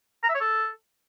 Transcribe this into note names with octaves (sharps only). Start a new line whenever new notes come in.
A#5
E5
C#5
A4